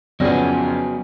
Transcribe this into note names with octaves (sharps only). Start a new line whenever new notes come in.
F2 C#3 F#3 B3 C#4 G#4 D5 A#6